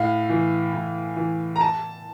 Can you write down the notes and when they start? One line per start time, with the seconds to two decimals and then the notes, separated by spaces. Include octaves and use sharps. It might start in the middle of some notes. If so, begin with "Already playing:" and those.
Already playing: A2 F5
0.29 E3
0.73 A2
1.16 E3
1.56 A#5
1.61 A5